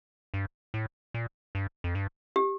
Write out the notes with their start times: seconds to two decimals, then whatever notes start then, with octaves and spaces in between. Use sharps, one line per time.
0.34 G2
0.74 A2
1.14 A#2
1.55 G2
1.84 F2
1.95 G2
2.36 G4